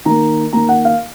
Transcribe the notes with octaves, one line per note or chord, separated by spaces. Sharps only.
D#3 A#3 A#5
D#3 A#3 A#5
F#5
F5